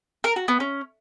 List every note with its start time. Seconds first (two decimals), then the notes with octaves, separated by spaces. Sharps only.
0.24 A#4
0.36 F#4
0.48 B3
0.60 C#4